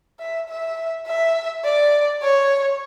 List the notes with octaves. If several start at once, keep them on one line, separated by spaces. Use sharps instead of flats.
E5
E5
E5
D5
C#5